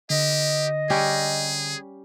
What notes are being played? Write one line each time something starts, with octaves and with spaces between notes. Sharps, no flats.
D3 G4 D#5
G3 C#4 G4 G#4